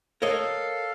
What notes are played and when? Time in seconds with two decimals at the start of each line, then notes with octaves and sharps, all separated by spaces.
0.22 A4 A#4 C#5 D#5 F5